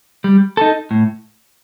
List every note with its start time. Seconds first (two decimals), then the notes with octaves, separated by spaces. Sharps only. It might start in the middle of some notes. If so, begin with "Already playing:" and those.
0.24 G3
0.57 D#4 A4
0.91 A2